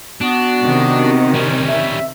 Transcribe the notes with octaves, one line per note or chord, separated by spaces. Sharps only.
B3 D4 F#4
C3 D#3
G3 C#4
E5